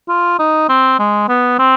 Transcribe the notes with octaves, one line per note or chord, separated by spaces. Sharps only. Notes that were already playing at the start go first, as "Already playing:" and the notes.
F4
D#4
C4
G#3
B3
C4